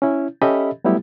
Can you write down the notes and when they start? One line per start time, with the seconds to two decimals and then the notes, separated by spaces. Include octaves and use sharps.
0.02 C#4 E4
0.42 C#4 G4 A4 D#5 E5 B5
0.84 F#3 G3 A3 B3 E4 G4